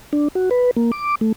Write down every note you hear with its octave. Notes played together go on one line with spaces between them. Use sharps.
D4
F#4
B4
A#3
D6
A3